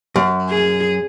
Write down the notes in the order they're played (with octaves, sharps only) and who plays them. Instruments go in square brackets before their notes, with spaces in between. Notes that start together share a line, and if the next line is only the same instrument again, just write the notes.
[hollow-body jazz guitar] F#2
[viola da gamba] G#4